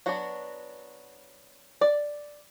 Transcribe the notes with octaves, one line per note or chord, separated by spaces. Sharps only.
F#3 B3 D4 F#4
D5